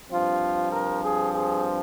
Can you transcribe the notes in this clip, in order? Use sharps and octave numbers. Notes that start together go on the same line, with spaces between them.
G2 F3 C4 F4
A#4
G#4
G#4